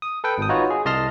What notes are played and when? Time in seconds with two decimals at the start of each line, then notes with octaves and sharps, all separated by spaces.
0.02 D#6
0.24 A4 B4 G5
0.38 G#1 D#6
0.49 D#4 F4 F#4 B4 C#5
0.70 G#4
0.85 C2 D#5 A5 C6 F6 A#6